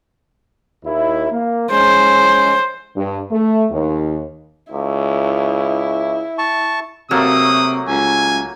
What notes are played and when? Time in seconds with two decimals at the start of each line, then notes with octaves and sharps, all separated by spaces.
0.85 D#2 E4
1.31 A#3
1.71 G#3 C#4 C5
2.97 G2
3.32 A3
3.71 D#2
4.72 C#2 E4
6.38 A5 C#6
7.11 C3 F#3 A3 A#3 D#6
7.88 C#2 G#5